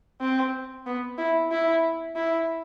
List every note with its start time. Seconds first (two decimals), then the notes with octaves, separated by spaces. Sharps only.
0.21 C4
0.86 B3
1.18 E4
1.51 E4
2.16 E4